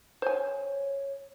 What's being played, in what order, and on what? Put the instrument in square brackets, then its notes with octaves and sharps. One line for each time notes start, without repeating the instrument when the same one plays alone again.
[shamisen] C5 G#5 [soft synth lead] C#5